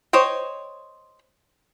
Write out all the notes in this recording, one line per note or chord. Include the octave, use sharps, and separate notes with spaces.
C5 C#5 D#5 G5